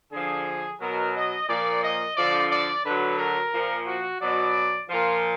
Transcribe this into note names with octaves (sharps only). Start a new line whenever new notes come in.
D3 F3 G#4
B2 F#3 A#4
D#5
A#2 F3 D5
D#5
D3 F3 D5
D5
D3 F#3 B4
A#4
A#2 F3
F#4
B2 F#3 D5
A#2 F3 F4